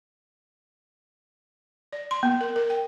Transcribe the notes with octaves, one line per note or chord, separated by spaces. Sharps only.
D5
C6
B3
A#4
A#4
G5